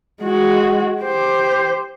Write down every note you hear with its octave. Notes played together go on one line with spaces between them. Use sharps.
G#3 F#4
G4 C5